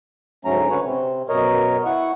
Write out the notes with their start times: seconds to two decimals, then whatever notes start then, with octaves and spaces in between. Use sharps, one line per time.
0.45 D2 G#2 F#3 A3 C#4 A#5
0.70 D3 C#4 B4 C#5
0.85 C3 C4
1.29 F#2 B2 A#4 C#5 D#5
1.86 E4 F#5 C#6